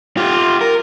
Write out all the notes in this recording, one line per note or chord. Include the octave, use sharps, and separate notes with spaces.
F4 G4
A#4